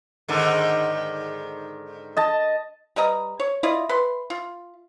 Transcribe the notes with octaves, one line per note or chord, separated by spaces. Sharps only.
G#2 D3 D#3
D#5 A5
G3 B4 D#5 A#5
C#5
E4 F4 D5 D#5
B4 C6
F4